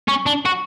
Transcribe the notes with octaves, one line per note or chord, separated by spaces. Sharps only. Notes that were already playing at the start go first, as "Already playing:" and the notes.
C#4
D4
F#4